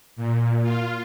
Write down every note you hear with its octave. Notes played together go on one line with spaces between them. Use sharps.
A#2
F4